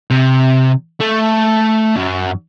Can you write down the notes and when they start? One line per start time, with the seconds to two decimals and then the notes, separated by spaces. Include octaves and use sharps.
0.10 C3
1.00 A3
1.96 F#2